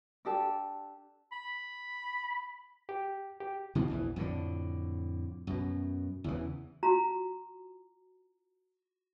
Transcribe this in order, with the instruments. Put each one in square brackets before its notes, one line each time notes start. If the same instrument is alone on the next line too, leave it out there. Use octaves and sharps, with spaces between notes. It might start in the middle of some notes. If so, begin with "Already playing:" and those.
[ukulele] D4 G4 A4
[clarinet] B5
[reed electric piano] G4
G4
[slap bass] B2 E3 F3
A#1 E2 E3
F2 A2 D3
F#2 B2
E2 C#3 E3
[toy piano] F4 F#4 A#5